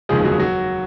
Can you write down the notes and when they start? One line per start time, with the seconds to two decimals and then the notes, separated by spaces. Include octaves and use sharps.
0.09 F1 D#2 C#3 F3 G#3 G#4
0.24 F#3 F#4
0.39 F#3 F#4